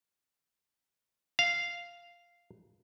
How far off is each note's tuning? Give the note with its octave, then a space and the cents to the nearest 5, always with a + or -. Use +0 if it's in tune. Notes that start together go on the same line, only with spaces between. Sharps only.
F5 -5